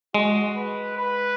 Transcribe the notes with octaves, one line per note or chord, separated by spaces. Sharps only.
G#3 F#4
B4
B4